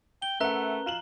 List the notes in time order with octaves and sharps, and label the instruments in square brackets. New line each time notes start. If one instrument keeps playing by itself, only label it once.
[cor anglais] G5 [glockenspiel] G7
[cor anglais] A3 [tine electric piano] C#4 A#4 B4 [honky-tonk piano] E5 F#5 [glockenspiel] A#5 F#6
[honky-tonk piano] F4 E7 F#7